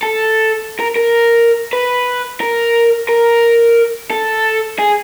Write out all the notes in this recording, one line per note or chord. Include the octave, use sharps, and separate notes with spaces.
A4
A#4
A#4
B4
A#4
A#4
A4
G#4